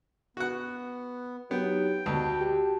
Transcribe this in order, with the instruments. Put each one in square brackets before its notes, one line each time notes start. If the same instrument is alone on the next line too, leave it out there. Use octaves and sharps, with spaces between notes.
[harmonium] B3 [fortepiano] F#4 F#5
[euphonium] F#3 [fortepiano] B3 [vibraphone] D#4 G4 [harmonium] G5
[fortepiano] D2 [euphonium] B2 [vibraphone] F#4 A5
[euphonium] G4